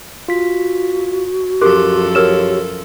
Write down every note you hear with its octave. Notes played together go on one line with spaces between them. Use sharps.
F4 F#4 B6
F#2 F3 G4 A4 A#4 C6 D6 F#6
G4 A#4 C#5 E6 F6 E7